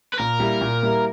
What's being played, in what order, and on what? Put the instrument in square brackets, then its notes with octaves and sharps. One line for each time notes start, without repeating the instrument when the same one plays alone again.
[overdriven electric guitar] B4
[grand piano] A#2 [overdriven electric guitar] A#4
[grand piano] G3 A#3 E4
A#2
G3 A#3 E4